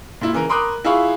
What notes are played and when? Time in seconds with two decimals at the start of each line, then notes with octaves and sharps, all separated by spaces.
0.21 A#2 E4
0.33 C#3 E3 A#4
0.49 A#4 B5 C6 D6 D#6 F#6
0.84 E4 F4 G#4 F5 B5 C#6